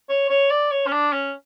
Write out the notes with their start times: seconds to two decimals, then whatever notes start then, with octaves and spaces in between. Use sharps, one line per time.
0.09 C#5
0.30 C#5
0.51 D5
0.71 C#5
0.87 C#4
0.92 D4
1.13 C#4